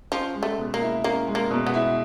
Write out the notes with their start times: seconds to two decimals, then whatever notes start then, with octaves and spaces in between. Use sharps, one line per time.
0.12 F3 C#4
0.35 G#3
0.43 A3
0.58 B2
0.74 A#3
0.81 E4
1.04 A#3 C#4
1.28 G#3
1.35 A#3
1.50 B2
1.67 B3
1.74 E4